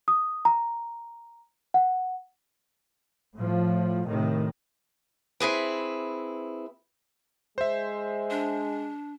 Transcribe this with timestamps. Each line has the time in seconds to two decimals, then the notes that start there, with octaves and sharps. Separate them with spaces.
0.08 D#6
0.45 A#5
1.74 F#5
3.35 A2 F3
4.05 A2 C3 D#3
5.40 C4 E4 G#4 B4
7.58 G#3 C5 E5
8.30 D4